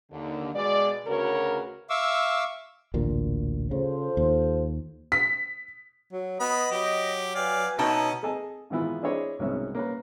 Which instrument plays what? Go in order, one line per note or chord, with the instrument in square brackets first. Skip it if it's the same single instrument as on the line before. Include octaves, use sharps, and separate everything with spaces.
[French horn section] D#2 D3
B2 G#3 D5
D2 C#3 F#4 A#4 B4 C#5
[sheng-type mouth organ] E5 F5 C#6 D6 E6
[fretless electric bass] A1 D2 A#2
[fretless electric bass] C#3 [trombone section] F4 A4 C5
[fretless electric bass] D#2
[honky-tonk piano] B6
[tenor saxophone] F#3
[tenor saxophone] B3 [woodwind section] D#5 [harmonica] B5
[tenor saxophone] F#3 [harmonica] G4
[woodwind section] B4 G5 G#5 [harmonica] D5 F5
[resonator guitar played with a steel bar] B2 D#4 A5 [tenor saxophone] B3 [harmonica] C#4 [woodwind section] D#5 E5 A#5
[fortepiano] G#4 A4 D#5 G#5 A5
G#2 D#3 E3 B3 E4 F4
D4 E4 G#4 C5 C#5 D#5
C2 G#2 B2 F#3 C#4 E5
A#3 C#4 B4